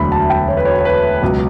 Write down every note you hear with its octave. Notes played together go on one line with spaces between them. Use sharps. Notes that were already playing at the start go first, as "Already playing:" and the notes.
Already playing: E1 D2 D3 F#3 B5
A5
G5
C#5
B4
C#5
C#5
B4
C#2 B2 F#3